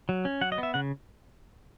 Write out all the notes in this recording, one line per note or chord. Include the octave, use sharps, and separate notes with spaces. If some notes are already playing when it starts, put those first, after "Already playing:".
F#3
C#4
F#3 F#5
D#5
B3
E5
C#3 F#5